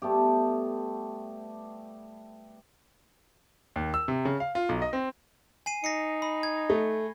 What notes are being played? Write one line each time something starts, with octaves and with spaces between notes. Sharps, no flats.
G3 A3 B3 G4
D#2
E6
C3
C#3
F5
F4
B1
D#5
C4
G#5 C7 D#7
D#4 A#6 C7 C#7
B5
G#6
A3